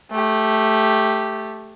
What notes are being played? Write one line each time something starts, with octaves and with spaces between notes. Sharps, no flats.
A3 G4